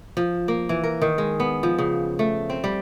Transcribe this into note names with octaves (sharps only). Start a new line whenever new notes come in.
F3
A#3
E3
A#4
D#3
G#3
B3
F3
C#3
A3
C4
G3